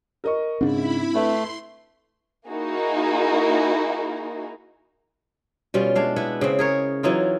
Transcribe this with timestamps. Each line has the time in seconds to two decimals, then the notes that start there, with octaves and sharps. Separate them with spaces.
0.24 A#4 D#5 C#6
0.61 G#2 C#3 C4 D4 E4 B5
1.14 A3 B4 E5 C6
2.50 A#3 D#4 E4 F#4 G#4 A#4
5.74 B2 G3 C#4 F4
5.95 G#3 D4 F5
6.16 B3 E4 B4
6.41 C#3 C4
6.59 G#4 A#4 C#5
7.03 E3 F#3 D#4 F4